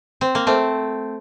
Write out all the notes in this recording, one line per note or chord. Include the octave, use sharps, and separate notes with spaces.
C4
A#3
A3 C4